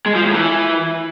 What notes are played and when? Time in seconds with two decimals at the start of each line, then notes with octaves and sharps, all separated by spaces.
0.06 G#3
0.15 F3
0.25 A2
0.34 E3